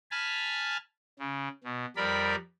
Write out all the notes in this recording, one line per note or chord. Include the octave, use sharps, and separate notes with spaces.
G#5 A5 B5 F6
C#3
B2
F2 G3 A#4 D5 B5